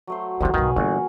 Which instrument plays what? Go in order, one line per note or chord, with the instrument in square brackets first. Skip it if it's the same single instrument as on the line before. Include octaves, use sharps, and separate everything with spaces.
[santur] F#3 A3 C5
[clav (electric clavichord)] C2 C3 [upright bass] D#3 G#3 [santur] A#5
[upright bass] B1 G2 [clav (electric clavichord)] D#3 [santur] B4 F5 G#5
[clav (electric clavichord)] G1 [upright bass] E3 A#3 [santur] F#4 G#4 A#4